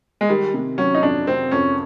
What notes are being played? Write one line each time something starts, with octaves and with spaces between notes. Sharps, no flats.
G#3
D#3 G3
C3
F#3 C#4
D#4
F2 D4
C3 C4
F2 C#4